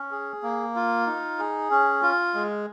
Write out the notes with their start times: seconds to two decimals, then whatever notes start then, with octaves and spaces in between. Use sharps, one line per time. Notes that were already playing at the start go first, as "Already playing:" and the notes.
Already playing: C#4
0.11 G#4
0.43 A#3
0.75 F4
1.06 D#4
1.39 G#4
1.71 C#4
2.02 F4
2.34 G#3